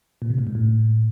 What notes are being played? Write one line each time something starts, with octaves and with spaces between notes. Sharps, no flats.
A#2
C3
A2
G#2
A2